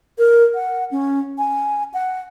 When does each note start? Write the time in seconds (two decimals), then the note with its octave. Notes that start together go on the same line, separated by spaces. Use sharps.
0.18 A#4
0.54 F#5
0.91 C#4
1.38 G#5
1.94 F#5